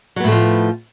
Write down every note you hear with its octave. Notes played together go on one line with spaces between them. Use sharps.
A2 F3 F#3 A3 B3